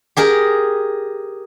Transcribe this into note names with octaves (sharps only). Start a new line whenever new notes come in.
G4 G#4 A#4